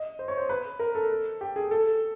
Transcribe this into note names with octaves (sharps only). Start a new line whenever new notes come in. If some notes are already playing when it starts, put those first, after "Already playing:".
Already playing: D#5
C5
C#5
C5
B4
A#4
A4
G4
G#4
A4